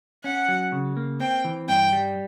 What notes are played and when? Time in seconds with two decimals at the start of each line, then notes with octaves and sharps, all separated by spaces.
0.24 C#4 F#5
0.48 F#3
0.72 C#3
0.97 A#3
1.20 C4 G5
1.44 E3
1.69 G2 G5
1.92 G3